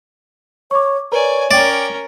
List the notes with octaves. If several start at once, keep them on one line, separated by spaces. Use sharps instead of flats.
C#5 C#6 D6
A#4 B4 C#5 D5 G#5 A#5
C#4 A#4 D5 G5 D6